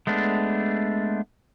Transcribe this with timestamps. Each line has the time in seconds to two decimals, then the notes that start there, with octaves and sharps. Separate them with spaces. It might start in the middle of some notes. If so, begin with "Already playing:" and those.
0.07 G#3 A3 B3 D4